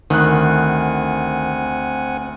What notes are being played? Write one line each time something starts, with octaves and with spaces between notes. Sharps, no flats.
D2 D#3 C4 F#5 G#5 F#6